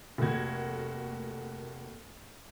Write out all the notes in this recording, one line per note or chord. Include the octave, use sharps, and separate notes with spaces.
F1 A3 A#3 F#4 G#6